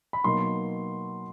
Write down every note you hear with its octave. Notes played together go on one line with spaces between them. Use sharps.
B5
B2 F#3 A#3 D#4 C6